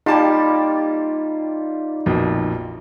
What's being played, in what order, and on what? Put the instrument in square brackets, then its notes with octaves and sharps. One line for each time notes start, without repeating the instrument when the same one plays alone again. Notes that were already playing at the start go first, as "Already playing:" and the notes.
[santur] G3 A#3 F4 [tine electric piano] D#4 [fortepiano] G4 A5
[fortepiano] A#1 F2 B2